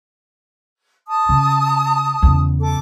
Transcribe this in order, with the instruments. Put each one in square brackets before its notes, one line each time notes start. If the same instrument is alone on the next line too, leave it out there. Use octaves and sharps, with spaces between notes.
[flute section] A5 D#6
[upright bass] C#3
E2 C#3
[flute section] A4 D6